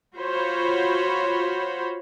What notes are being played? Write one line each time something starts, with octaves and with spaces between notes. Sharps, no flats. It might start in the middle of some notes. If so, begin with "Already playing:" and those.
F4 F#4 C5 C#5 B5